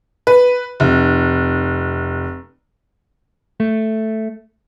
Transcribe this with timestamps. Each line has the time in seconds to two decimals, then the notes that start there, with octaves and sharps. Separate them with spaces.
0.27 B4
0.80 F1
3.60 A3